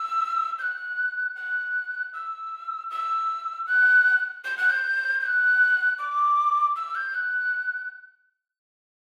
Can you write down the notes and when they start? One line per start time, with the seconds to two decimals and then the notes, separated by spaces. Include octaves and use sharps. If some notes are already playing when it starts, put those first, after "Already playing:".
Already playing: E6
0.58 G6
0.62 F#6
1.36 F#6
2.13 E6
2.90 E6
3.67 F#6
4.44 G6
4.57 F#6
4.70 G6
5.21 G6
5.26 F#6
5.98 D6
6.76 E6
6.95 G6
7.14 F#6